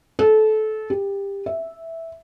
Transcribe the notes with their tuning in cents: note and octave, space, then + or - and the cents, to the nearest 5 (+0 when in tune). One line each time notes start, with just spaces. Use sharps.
A4 -25
G4 +20
E5 -5